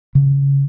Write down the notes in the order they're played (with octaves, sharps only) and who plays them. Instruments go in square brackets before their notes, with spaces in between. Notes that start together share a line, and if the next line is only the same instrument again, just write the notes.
[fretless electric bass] C#3